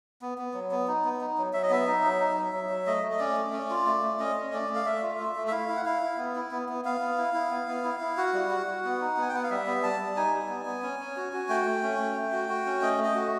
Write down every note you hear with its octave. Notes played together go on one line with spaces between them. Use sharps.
B3
B3
F#3
B3
D#4
B3
D#4
F#3
F#3 E5
D#5
B3 E5
D#4
F#3
D#4
F#3
F#3
F#3
A3 D#5
A3
D#5
C#4 D5
A3
C#4
F4
A3
A3
C#4 D#5
C#4
A3 D5
A3
F5
A3 E5
F4
A3
A3
E5
E4 F5
E4
F#5
E4 F5
E4
B3
E4
B3
B3
B3 F5
B3
E4
E4
B3
B3
E4
E4
F#4 F#5
G3
F#4
F#4
B3
D#4
B3 G#5
G5
B3 F#5
F5
G3 E5
B3
G3 A5
G3
D#4 G#5
G3
B3
B3
C#4
C#4
F#4
F#4
A3 G5
A3
C#4
A3
A3
F#4
F#4
C#4
A3 D#5
A3
D#5
F#4